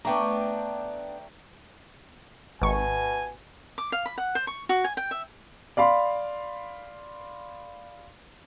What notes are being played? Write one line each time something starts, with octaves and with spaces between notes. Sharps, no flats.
A3 B3 D4 D5 G5 A#5
G#1 B2 G#5 C#6
D6
F5
B5
F#5
C5
C#6
F#4
G#5
G5
E5
D5 F5 B5 C6